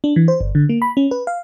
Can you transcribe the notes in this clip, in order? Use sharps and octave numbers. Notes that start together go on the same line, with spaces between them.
D4
E3
C5
G1
D3
A#3
B5
C#4
B4
F5